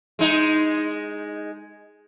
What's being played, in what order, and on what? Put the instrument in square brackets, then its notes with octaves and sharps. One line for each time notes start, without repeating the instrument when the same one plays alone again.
[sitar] G#3 D#4